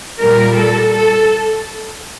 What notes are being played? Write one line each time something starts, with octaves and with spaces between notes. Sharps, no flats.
A#2 G3 A#4
A4
A4